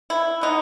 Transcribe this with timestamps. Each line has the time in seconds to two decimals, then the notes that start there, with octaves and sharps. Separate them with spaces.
0.10 E4
0.41 B2 G#3 B3 D#4